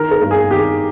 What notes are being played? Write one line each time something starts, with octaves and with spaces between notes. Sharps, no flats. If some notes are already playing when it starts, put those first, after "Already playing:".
Already playing: D#3 A#4
A#4
G2
G#4
D#3 G4